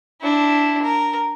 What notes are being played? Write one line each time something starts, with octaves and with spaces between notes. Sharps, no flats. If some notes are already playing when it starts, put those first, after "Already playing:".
D4 E4
A#4